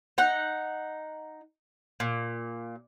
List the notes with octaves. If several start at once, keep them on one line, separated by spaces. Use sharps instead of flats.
D#4 F#5
A#2